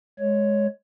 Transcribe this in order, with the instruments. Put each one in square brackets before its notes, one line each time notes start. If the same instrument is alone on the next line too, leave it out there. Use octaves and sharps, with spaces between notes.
[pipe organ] G#3 C#5